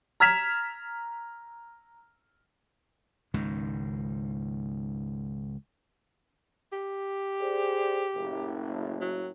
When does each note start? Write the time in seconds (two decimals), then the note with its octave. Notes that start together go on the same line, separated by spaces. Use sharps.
0.20 A#5 F6 G#6 B6 E7 F7
3.34 C#2 G#2 D#3
6.72 G4
7.40 G#4 C5 D5
8.15 F#1 A2
9.01 F#3